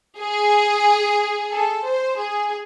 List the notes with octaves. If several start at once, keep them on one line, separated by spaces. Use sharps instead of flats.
G#4
A4
C5
G#4